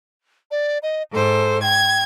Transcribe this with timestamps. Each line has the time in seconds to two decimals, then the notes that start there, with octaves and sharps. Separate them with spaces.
0.51 D5
0.83 D#5
1.13 G#2 A4 C5
1.62 G5 G#6